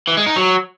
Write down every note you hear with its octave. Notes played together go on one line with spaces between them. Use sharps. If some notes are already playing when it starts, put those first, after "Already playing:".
E3
G#3
D#4
F#3